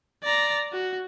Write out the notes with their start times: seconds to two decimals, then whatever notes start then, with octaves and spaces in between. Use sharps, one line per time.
0.24 D5 A#5
0.73 F#4